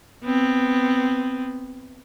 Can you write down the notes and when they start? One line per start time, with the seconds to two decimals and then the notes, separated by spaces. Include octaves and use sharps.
0.24 B3 C4